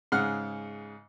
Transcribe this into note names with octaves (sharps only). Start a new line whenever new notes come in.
G#2 C#3 F#5 F6